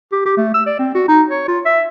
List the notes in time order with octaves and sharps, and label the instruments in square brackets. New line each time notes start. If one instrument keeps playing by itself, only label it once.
[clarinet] G4
G4
A3
E6
D5
C4
F#4
D#4
C#5
F4
E5